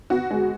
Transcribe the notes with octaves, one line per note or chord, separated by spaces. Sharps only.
B3 F#4
G#3